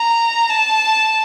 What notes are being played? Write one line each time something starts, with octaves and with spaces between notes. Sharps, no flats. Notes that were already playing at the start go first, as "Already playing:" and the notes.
Already playing: A#5
A5